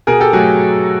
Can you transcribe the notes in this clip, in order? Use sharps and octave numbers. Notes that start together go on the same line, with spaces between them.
B2 G#4 A#4
G4 A4
F#3 A3 F#4 G#4